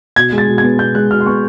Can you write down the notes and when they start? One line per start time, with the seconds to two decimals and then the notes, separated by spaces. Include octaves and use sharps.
0.16 B2 G#6
0.32 G#3
0.38 A6
0.48 B2
0.58 G#6
0.63 B3
0.79 B2 G6
0.95 G#3 F#6
1.10 B2 F6
1.21 C6
1.26 B3 C#6